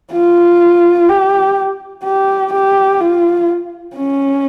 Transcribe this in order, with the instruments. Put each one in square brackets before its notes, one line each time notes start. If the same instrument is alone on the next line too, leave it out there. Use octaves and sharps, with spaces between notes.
[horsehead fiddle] F4
G4
G4
G4
F4
C#4